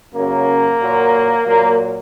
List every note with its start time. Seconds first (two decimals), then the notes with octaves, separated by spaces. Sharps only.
0.14 F#2 C#3 F#3 A#3
0.80 A#2 F#3
1.46 A#2 F#3 A#3